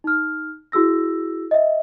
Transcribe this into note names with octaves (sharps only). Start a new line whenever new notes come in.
D#4 F6
E4 F#4 G#4 E6 A#6
D#5 E5